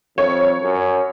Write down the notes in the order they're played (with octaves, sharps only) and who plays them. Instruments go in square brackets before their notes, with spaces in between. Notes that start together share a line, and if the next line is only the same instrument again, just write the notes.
[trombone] F2 [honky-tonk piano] C#5
[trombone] F#2